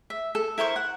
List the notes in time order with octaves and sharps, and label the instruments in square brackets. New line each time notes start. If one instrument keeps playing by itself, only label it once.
[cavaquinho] E5
A4
E4 A#4 C5 C#6
F#5